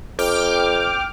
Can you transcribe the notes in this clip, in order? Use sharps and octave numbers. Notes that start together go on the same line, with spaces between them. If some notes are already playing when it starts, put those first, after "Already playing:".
F2 G5 D6 F6